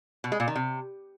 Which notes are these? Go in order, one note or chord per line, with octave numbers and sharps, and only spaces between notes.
B2
G#3
A#2
D#3
C3